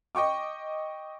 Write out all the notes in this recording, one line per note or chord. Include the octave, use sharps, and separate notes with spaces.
D#5 G5 C#6 D6